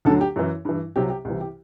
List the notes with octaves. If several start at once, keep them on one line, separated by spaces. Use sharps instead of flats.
D2 D3 F#3 A4
G4
F#2 E3
G2 E3
C2 C3 F#3 G4
G4
C2 C3 E3
G4